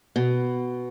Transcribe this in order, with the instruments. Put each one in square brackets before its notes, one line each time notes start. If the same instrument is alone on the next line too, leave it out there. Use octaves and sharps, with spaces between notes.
[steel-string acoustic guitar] B2